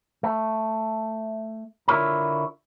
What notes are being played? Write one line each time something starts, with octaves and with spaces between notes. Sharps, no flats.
A3
D3 E4 F4 A#4 C#5 A#5